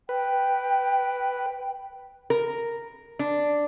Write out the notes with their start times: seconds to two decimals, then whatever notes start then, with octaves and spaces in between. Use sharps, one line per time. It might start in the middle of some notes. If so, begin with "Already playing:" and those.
0.09 B4 G5
2.30 A#4
3.19 D4